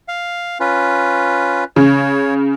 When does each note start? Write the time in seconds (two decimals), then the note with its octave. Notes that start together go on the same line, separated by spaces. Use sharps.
0.08 F5
0.60 C#4 F4 B4
1.76 C#3 C#5